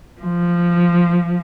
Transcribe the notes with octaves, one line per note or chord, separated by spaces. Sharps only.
F3